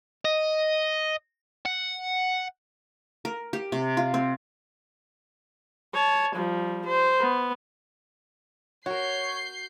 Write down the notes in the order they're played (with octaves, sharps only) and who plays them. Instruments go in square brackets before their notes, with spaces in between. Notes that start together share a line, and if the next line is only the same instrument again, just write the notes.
[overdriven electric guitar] D#5
F#5
[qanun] A#4
G4
C3
F4
C4
[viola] C#5 A5
F3 G3
C5
B3
[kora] F#4 A#4 [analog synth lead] C#5 [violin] G6 C7